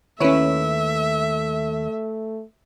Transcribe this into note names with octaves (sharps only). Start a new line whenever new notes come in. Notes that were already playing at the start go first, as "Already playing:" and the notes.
D#2 A3 C#4 E4 B4 C#5 E5